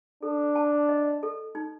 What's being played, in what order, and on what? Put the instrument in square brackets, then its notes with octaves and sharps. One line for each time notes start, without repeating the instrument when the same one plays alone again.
[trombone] D4 [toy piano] A4
[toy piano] A5
D#5
A4
D#4